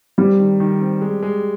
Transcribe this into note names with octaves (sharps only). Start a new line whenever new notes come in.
G3 C4
D#3
D#3
C4
G#3
G#3